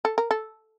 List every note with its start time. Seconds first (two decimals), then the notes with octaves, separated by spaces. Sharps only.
0.05 A4
0.18 A#4
0.31 A4